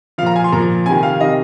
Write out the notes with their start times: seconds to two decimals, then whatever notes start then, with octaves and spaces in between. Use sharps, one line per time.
0.18 F3 F5
0.22 A#2 A#5
0.36 G#5
0.44 C6
0.52 A#2 F3 A#5
0.86 F2 C3 D#3 G#5
1.03 F5
1.20 C3 D#3 D#5